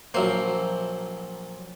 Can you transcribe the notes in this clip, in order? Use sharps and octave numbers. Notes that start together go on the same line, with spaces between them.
A#1 F#3 A#3 C5 E5